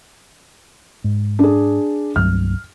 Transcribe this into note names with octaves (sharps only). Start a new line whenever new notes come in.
G#2
D4 G#4
C2 G2 F#3 F6